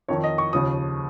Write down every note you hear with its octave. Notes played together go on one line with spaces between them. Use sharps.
F2 D#3 C#5
D#5
C#6
D#2 C#3 F3 D#6